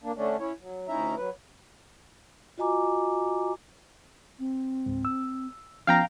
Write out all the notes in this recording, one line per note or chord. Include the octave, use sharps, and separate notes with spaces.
A#3 D4
D3 A3 C#4 D4
C#4 E4 C#5
F#3
D2 C#4 D#4 E4 E5 A#5
F#3 B4
F4 F#4 D#5 G#5 A#5 D6
C4
C#2 G#2
E6
F3 B3 C#4 F5 G5 A#5